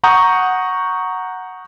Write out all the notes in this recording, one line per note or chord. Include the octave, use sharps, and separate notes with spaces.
F#5 A#5 C#6 D#6 G6